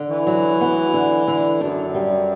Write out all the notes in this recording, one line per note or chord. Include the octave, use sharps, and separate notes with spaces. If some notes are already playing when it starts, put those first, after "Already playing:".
Already playing: D3
E3
F#3
B3
D3
D3
F#2 D4
G3